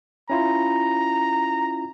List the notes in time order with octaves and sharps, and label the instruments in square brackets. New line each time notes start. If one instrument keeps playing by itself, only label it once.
[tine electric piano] C#4 E4 F4 [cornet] A#5